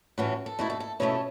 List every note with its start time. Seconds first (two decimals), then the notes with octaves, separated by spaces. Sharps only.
0.18 A2 E3 C#4 F#4
0.46 A4
0.59 B2 A3 E4 F#4
0.70 A4
0.80 A4
1.00 B2 A3 C#4 E4 A4 C#5